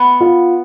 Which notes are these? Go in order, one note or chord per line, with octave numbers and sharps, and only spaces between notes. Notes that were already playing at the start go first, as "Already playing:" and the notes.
Already playing: B3
F4